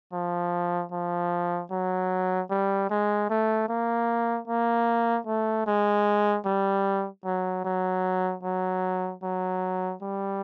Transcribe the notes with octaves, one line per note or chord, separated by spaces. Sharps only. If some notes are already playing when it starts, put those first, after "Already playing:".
F3
F3
F#3
G3
G#3
A3
A#3
A#3
A3
G#3
G3
F#3
F#3
F#3
F#3
G3